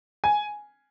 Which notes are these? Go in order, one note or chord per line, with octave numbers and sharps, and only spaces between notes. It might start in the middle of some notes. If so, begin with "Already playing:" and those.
G#5